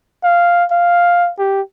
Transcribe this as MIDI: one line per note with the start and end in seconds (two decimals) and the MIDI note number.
0.23 0.64 77
0.71 1.31 77
1.38 1.61 67